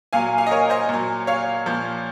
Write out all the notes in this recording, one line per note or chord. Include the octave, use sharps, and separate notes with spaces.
A#2 F#3 F5 G#5
F5 G#5
D#5
A#4 C#5
C5 D#5
A#2 F#3
C#5 F5
A#2 F3